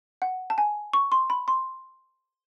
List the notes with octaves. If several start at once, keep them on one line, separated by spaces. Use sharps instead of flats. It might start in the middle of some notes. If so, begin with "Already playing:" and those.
F#5
A5
G#5
C#6
C6
B5
C6